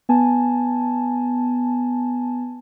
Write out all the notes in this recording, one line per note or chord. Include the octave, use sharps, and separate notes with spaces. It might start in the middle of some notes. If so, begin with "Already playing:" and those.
B3 G#5 A5